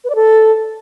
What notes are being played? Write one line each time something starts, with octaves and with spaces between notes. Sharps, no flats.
B4
D5
A4